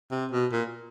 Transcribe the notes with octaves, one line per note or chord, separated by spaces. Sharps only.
C3
B2
A#2